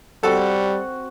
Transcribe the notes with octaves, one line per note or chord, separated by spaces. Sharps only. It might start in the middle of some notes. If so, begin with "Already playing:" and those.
G3 C4 F#4 A4